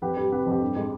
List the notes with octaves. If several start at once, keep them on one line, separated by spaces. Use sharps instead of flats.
F2 G4 B4
G3
C3 G4 B4
F2
G4
G2
G#3